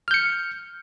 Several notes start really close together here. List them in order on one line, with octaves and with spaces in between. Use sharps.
F6 G6 C#7